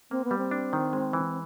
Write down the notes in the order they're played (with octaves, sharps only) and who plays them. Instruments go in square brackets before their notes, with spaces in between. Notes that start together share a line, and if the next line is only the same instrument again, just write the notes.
[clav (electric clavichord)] A#3 [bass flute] C4
[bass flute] B3
[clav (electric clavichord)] G3
[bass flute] C4
[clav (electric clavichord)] D4
D#3
G#3
E3